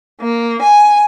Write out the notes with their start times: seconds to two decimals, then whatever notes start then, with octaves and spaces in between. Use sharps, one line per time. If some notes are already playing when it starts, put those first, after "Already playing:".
0.21 A#3
0.62 G#5